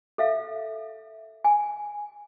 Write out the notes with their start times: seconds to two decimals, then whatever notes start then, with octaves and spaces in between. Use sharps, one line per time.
0.18 A4 E5 F5
1.44 G#5